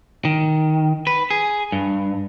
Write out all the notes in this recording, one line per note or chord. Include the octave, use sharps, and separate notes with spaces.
D#3
B4
G#4
G2